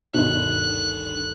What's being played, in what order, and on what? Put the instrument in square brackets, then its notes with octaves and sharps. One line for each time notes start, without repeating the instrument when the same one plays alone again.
[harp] G#1 D2 G2 [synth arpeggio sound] B2 D#3 [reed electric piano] D4 [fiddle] F#6